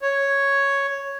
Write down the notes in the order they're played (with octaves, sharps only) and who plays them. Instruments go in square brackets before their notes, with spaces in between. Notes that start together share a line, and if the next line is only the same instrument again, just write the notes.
[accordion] C#5